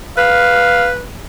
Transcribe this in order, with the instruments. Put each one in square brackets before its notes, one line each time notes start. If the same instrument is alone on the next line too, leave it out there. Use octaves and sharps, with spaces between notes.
[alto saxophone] B4 [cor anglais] F5